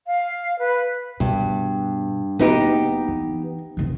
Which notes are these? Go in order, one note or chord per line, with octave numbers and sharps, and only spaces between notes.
F5
B4
G2 B2
F#1 B3 D#4 G4
E3
F1 D#3